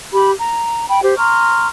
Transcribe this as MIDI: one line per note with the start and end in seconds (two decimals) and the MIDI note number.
0.13 0.31 67
0.13 0.31 83
0.39 0.85 82
0.89 1.01 79
0.89 1.01 83
1.03 1.17 67
1.03 1.17 72
1.18 1.67 82
1.18 1.67 84
1.18 1.67 85
1.18 1.67 89